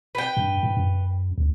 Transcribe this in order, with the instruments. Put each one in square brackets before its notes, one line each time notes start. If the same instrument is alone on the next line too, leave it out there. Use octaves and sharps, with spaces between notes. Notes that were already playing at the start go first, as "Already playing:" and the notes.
[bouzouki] B4 G5
[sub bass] G2
G#2
F#2
D2